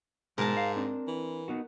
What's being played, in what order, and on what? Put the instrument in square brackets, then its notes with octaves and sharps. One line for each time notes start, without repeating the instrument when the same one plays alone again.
[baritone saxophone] G#2 [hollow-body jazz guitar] B2 G#3 [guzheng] A#4 A5
[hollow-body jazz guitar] F5
C4 D4
[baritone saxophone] E3
[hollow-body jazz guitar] B3 D#4 F#4